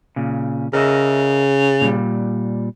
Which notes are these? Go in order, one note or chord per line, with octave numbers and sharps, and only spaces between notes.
A#2 C#3
C#3 A#4 D#5 E5
A#2 G3